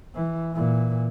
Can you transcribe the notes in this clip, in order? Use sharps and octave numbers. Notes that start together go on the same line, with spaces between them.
E3
A#2 E3